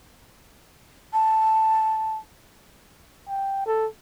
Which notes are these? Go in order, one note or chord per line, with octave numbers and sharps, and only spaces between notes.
A5
G5
A4